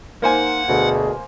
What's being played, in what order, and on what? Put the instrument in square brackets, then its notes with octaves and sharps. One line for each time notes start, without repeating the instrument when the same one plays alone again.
[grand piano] A#3 C5 G#5 [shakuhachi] D#4 [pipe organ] F#5
[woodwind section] D2 B2 [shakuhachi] G#4